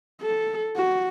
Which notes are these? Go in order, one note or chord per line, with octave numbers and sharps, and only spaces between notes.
A4
F#4